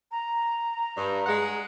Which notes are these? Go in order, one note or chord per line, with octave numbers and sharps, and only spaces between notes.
A#5
G2
G#3 F#5